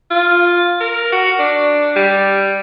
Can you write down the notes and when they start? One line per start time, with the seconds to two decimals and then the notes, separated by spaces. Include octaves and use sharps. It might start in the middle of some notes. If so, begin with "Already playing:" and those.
0.10 F4
0.80 A#4
1.12 F#4
1.39 D4
1.96 G3